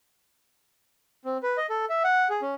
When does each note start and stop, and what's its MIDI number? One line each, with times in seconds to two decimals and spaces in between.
1.25 1.37 60
1.43 1.57 71
1.57 1.66 75
1.70 1.85 69
1.90 2.03 76
2.04 2.28 78
2.30 2.41 68
2.42 2.54 61